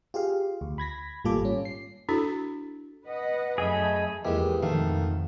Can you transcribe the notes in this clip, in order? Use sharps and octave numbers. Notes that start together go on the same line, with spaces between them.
F4 G4 G#4 F5
D2
B5 G#6 A#6 B6
G#1 A#2 G3 F4 A4 D6
C#4
C7
D4 E4 F#4 A4
B4 D#5 F#5
F#2 A3 G#4 D#5 B5
E2 E3 F3 G#3 A#3 G4
F2 G#2 B2 D#3 A3 F5